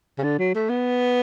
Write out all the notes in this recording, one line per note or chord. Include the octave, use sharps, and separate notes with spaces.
C#3
D3
F#3
A3
B3